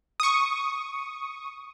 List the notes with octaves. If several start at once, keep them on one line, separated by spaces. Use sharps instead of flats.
C#6 D#6